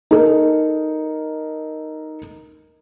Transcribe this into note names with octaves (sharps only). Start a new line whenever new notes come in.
D#4 A4 A#4